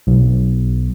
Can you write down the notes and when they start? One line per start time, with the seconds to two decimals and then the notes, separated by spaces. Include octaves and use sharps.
0.07 B1